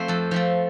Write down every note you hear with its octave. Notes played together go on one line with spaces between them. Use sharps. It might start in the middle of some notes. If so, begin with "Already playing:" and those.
Already playing: F3 A3 C4 C5
F2 A4
F3 A3 C4